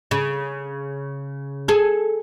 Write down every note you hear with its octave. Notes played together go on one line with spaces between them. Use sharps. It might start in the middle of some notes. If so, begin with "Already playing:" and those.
C#3
G#4 A4